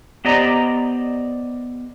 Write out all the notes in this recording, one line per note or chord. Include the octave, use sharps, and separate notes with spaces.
B3 G4 C5 D5 D#5 A#5